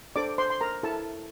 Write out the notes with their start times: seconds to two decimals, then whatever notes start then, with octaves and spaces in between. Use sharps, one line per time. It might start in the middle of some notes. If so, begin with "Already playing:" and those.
0.16 D4 A4 C5 D5 D6
0.38 C5 C6
0.50 C6
0.61 A#4 A#5
0.83 E4 A4 A#4 A5